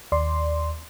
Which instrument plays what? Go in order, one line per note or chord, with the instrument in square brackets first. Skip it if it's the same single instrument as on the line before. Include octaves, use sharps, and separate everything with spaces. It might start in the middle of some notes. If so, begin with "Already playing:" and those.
[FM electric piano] D#2 D5 C6